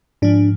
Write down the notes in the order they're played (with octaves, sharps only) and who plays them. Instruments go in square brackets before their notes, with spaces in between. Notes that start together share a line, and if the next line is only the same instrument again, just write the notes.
[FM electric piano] G#2 F3 D4